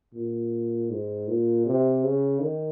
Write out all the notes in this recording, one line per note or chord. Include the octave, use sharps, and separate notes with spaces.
A#2
G#2
A#2
C3
C#3
D#3